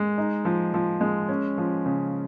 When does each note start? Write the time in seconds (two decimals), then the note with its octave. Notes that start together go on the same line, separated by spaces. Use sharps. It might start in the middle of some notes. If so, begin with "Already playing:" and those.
Already playing: G#3
0.18 D#4
0.45 F3
0.74 F3
1.01 G#3
1.29 C#4
1.58 F3
1.86 C#3